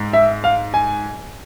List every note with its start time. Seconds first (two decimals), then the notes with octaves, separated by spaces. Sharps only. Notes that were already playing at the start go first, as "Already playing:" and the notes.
Already playing: G#2
0.13 E5
0.44 F5
0.74 G#5